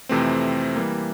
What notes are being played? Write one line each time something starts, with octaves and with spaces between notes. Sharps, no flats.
F2 C3 E3 A3 C4
E3 G3 A#3